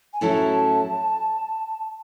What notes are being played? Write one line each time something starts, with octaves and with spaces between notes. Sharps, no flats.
G#5
A2 F#3 C#4 E4 A4 A5